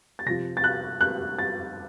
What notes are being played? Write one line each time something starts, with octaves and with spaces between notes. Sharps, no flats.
A6
C3 F3 A#6
A6
F#6
F#6
A6